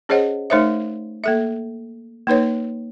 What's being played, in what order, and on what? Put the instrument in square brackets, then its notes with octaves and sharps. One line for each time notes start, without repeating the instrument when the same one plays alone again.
[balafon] C#4 G#4 C5 C#5 D#5 F#5
A3 D#4 A#4 C5 C#5 E5
A#3 A4 E5
A#3 D#4 B4 C#5